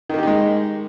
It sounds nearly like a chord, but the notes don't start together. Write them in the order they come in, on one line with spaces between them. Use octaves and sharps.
D#3 A#3 G4 D#4 G#3